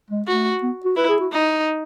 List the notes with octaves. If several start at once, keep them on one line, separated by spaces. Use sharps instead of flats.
G#3
A3 F#4
B3
F#4
E4 B4
G#4
F#4
D#4